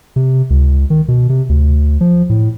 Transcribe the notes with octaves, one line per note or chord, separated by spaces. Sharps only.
C3
C#2
D#3
B2
C3
D2
F3
A2